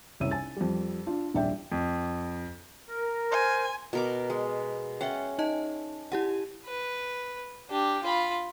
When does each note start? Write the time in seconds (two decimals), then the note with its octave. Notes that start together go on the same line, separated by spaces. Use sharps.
0.20 F#1 C2 E4 C#5 E6 D#7
0.31 G#5 A6
0.57 F2 G3
1.07 D4 F4
1.34 D#1 A#1 D5 E5 G5
1.72 F2
2.88 A#4
3.32 C5 G#5
3.93 B2 A#4 D6
4.30 G#3
5.01 C#4 E5 F#5 G5
5.39 D#4 D#5 A5
6.12 E4 G4 F#5 G#5
6.66 B4
7.70 D4 G4
8.03 F4 B5